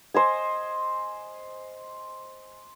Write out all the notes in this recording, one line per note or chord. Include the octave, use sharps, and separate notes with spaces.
C5 D#5 G#5